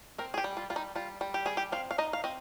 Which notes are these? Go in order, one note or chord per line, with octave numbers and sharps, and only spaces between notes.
C4 A#4
G#4
G4
G3
F4
G3 F4
D#4
G3 F4
G3
G4
G3 G#4
G4
C4 F5
F5
D#4 D#5
F5
C4 D#5